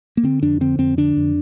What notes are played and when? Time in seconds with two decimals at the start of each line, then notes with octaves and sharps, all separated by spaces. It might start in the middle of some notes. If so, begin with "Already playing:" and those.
0.17 A#3
0.23 D3 C4
0.42 F2 D4
0.61 D3 C4
0.79 F2 C4
0.97 D3 D4
1.17 F2